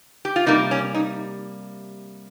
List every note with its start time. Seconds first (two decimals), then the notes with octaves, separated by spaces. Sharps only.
0.25 G4
0.36 F4
0.46 C3 G3 A#3 D#4
0.71 C#4
0.94 D#4